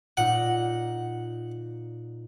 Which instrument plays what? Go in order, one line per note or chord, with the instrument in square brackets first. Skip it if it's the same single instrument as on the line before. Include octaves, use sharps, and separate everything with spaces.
[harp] A#2 D#4 [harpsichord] F#5